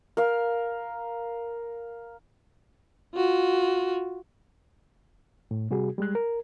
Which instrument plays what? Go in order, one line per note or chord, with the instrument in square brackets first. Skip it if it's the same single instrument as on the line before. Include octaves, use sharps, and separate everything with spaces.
[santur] A#4 F5
[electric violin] F4 F#4
[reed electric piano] A2
C3 G3 F#4 G#4
G3 G#3 F#6
A#4